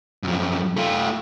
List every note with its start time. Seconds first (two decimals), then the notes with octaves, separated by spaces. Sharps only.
0.23 F#2 F3
0.77 A3 F4